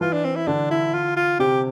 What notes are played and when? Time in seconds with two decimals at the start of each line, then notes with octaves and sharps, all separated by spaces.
0.01 E3 F4
0.13 D4
0.25 C4
0.36 E4
0.47 D3 D4
0.71 E4
0.94 F4
1.17 F4
1.39 C3 G4